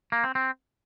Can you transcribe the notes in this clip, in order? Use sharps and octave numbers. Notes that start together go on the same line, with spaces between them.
A#3
C4
C4